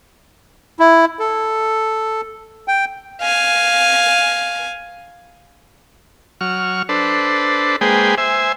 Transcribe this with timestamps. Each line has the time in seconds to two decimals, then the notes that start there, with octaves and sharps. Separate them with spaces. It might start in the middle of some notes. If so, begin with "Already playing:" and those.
0.79 E4
1.19 A4
2.68 G5
3.22 F5 G#5
6.41 F#3 C#6 F6
6.89 D4 A4 B4 C5
7.81 G#3 A#3 G#4 B4 C5 G5
8.18 C5 E5 G#5